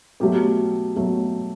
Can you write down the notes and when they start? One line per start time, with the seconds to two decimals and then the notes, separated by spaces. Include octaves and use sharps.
0.20 B2 F#3 A3 G4
0.96 B2 F#3 A3